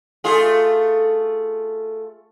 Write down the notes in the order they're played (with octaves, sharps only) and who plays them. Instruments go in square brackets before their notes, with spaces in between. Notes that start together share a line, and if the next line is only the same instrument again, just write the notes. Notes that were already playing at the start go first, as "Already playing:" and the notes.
[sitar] A3 F4 G#4